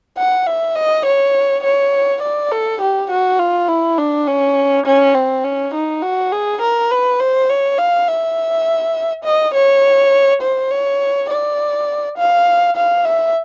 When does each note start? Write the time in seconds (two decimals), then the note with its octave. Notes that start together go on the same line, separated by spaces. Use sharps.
0.18 F#5
0.47 E5
0.75 D#5
1.06 C#5
1.64 C#5
2.22 D5
2.52 A4
2.81 G4
3.11 F#4
3.39 F4
3.69 E4
3.98 D4
4.27 C#4
4.86 C#4
5.15 C4
5.44 C#4
5.74 D#4
6.02 F#4
6.32 G#4
6.61 A#4
6.91 B4
7.20 C5
7.49 C#5
7.78 F5
8.07 E5
9.24 D#5
9.54 C#5
10.42 C5
10.71 C#5
11.30 D5
12.18 F5
12.76 F5
13.05 E5